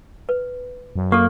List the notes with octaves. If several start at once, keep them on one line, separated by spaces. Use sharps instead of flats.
B4
F#2
A#3 G4 A4